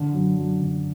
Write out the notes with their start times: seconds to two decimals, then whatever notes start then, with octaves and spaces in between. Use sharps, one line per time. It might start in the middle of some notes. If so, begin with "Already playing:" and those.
Already playing: D3 D4
0.13 F#2
0.36 F#2
0.60 D3